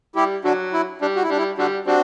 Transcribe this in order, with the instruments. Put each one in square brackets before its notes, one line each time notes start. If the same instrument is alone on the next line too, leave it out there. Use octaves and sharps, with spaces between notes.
[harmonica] G3 [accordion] E4 G4
[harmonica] D3 F#3 [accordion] D4 F#4
[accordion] E4
[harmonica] G3 [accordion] D4
[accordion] F#4
E4
[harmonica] G3 [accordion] D4
[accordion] E4
[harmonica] D3 G3 [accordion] D4 F#4
[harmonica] G3 C4 [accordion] D4 F#4